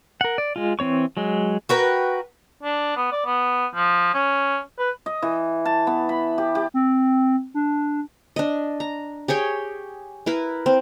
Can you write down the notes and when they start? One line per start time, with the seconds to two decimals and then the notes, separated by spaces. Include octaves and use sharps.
0.21 A#4 F#5
0.38 D5
0.56 G#3 F4
0.79 E3 C4 C#5 C#6
1.17 F#3 G#3
1.69 F#4 A#4 B4 G5
2.63 D4
2.97 B3
3.12 D5
3.26 B3
3.75 F3
4.14 C#4
4.79 B4
5.06 D#5
5.22 E3
5.65 A5
5.87 B3
6.09 B5
6.38 G4
6.55 G4
6.74 C4
7.54 D4
8.36 D4 D#5
8.80 A#5
9.28 G4 G#4 C#5 G5
10.26 E4 A#4 B4
10.66 C4